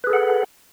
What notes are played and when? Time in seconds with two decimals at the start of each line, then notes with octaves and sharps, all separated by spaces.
0.04 B4
0.07 G#4
0.10 A4
0.13 F#5